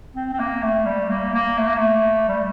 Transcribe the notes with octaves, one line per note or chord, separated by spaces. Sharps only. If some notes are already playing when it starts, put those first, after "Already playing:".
C4
C4
A#3
A3
G3
A#3
A#3
A3
A#3
A3
G3